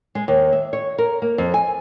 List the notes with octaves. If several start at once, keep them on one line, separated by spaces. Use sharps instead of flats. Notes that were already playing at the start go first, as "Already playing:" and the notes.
G#3
D#2
E5
C#5
A#4
A#3
F2
G#5